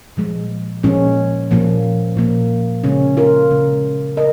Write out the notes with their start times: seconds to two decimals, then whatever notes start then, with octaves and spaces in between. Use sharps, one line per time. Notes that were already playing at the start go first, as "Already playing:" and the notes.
0.17 A#2 F3 G#3
0.83 A#2 F3 G#3 C#4
1.51 A#2 F3 A#3
2.17 A#2 F3 A#3
2.84 C#3 G#3 C#4
3.17 F4 A#4
3.51 C#3 G#3
4.17 A#4 D#5